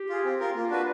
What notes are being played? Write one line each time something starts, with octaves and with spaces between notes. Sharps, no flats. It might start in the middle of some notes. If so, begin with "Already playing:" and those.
Already playing: G4
F4 G#4
C4
F4 A#4
A#3 F4
D4 F#4 B4